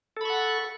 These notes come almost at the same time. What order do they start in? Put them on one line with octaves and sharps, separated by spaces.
A4 B5 C#6 F#5